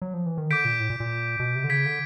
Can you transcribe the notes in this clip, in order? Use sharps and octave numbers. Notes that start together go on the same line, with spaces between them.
F#3
F3
E3
D#3
D3 D6 G6 B6 D7
A#2
A2
A#2
A#2
B2
C3
D3
C#3 G#6 B6 D7
D3